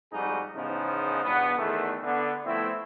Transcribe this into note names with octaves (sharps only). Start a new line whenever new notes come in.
F2 G#2 G3 D#4 F#4 G#4
E2 G#2 C#3 F3 B3 D#4
E2 G2 B2 B3
E2 D#3 A3
D3 B3
F3 A3 B3 C4 E4